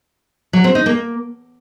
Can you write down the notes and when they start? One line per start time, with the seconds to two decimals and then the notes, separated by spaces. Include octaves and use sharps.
0.53 F#3
0.64 C4
0.75 D#4
0.86 A#3